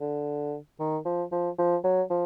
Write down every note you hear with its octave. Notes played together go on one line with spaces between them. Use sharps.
D3
D#3
F3
F3
F3
F#3
F3